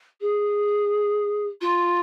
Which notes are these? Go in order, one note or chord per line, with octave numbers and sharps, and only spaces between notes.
G#4
F4